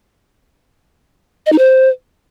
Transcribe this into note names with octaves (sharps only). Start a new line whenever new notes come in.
D#5
D#4
C5